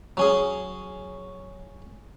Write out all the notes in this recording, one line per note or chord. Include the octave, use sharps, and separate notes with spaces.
F#3 C#4 G#4